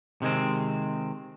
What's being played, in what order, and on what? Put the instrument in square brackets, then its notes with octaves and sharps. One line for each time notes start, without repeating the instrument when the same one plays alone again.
[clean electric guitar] C3 D#3 G#3 C4